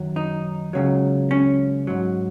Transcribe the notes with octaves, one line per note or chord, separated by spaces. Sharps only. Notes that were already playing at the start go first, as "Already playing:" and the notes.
Already playing: F#2 D#3 F#3
D#4
C#2 C#3 F#3
C#4
G#2 F#3